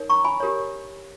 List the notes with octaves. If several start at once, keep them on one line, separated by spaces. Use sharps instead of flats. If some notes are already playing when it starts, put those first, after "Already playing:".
Already playing: D#4 A#4 C#5
A#5 C#6
G#5 B5
G4 A#4 C#5